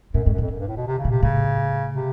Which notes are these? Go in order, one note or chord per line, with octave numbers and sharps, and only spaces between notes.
F#2 A2
F2 G#2
F#2
F2 A2
F#2
G2
A2
B2
C3
C#3
A#2
C3
A2 C#3
C3